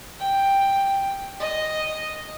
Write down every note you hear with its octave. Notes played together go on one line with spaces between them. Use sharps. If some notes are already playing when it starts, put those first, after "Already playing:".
G5
D#5